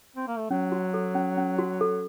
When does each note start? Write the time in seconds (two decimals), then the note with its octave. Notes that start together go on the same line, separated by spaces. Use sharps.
0.16 C4
0.28 A#3
0.38 A3
0.51 F#3 C#4
0.72 F#4
0.94 A4
1.15 C#4
1.38 C#4
1.59 F#4
1.81 A4